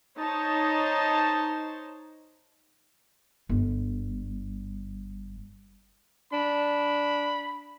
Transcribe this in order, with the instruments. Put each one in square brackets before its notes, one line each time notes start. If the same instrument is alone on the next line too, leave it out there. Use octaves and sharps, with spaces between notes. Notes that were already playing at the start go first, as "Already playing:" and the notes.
[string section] D#4 C5 C#5 A5
[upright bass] G1 G2
[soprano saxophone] D4 [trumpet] B5